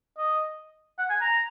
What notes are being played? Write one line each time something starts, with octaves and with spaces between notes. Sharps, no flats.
D#5
F#5
G#5
A#5